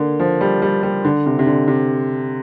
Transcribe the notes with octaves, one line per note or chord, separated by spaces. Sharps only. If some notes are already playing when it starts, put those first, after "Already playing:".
Already playing: D3 A#3
F3
G3
G3
G3
D3
C3
C3
D3
C3